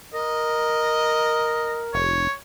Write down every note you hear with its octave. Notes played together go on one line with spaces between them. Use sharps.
A#4 D#5
F1 C#5